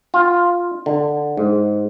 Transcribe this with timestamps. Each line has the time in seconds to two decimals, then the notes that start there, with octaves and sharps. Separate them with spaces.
0.14 F4
0.86 D3
1.37 G#2